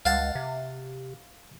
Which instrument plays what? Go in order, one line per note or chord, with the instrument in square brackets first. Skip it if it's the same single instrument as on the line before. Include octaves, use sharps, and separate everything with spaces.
[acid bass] C#2 [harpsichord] F5 F#5 A5
[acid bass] C3